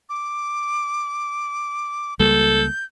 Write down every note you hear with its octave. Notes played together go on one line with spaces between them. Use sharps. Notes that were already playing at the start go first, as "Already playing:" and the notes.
D6
C#2 G3 A#3 A4 G6